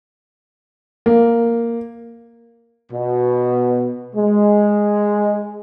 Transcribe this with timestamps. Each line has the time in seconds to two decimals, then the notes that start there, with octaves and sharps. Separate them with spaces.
1.06 A#3
2.92 B2
4.16 G#3